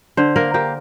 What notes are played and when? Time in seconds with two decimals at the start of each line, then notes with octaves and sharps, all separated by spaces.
0.17 D3 C5
0.36 A#3 A#4
0.54 A#3 G4